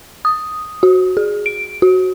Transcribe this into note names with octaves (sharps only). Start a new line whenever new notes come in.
D#6
F#4
G#4
D7
F#4